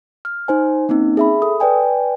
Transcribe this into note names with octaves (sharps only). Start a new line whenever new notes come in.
F6
D#4 C5 G#5
A#3 C4 C#4 D#4
G#4 E5 B5
A4 D#6
B4 D5 G5 G#5